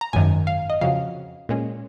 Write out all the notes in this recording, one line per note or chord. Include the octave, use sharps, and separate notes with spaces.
A#5
G#1 F#2 D#3 G#5
F5
D#5
F2 C#3 F#3 F5
A#2 G#3 C#4